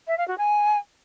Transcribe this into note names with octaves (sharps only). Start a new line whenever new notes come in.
E5
F5
F#4
G#5